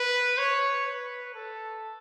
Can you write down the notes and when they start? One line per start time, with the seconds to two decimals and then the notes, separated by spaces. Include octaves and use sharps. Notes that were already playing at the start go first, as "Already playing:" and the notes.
Already playing: B4
0.38 C#5
0.86 B4
1.34 A4